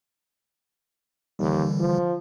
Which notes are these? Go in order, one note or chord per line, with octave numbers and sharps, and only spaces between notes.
D#2 D3 E3 G3
F3